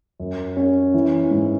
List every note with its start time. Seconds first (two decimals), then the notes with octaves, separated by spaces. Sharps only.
0.20 F#2
0.57 C#4
0.94 E3
1.31 G#2